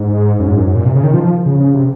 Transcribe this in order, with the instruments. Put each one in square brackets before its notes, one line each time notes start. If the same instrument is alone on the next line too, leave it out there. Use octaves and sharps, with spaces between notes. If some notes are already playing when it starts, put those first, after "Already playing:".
Already playing: [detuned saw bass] G#2
F#2
G#2
F#2
F#2
A#2
C3
C#3
D#3
F3
F3
C#3
C#3
C3